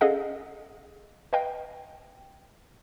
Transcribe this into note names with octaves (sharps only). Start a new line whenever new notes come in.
C#4 G#4 A4 D#5 F5 F#5
B4 D#5 F5 G5